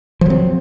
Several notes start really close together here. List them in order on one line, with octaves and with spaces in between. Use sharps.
F3 F#3 C4